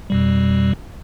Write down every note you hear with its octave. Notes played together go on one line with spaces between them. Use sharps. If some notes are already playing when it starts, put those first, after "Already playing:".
F2 B2 G3